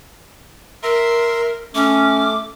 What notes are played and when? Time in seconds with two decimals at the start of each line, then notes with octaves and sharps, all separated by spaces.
0.83 A#4 E5 A#5 C6
1.75 A3 C#4 D6